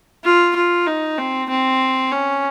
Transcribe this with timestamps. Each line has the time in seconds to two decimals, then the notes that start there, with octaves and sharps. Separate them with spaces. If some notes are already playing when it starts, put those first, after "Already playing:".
0.25 F4
0.56 F4
0.87 D#4
1.18 C4
1.50 C4
2.12 C#4